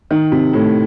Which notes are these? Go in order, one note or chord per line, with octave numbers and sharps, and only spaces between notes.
D#3
C3
A2